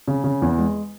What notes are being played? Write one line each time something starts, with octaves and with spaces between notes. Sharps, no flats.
C#3
C#3
E2
G#3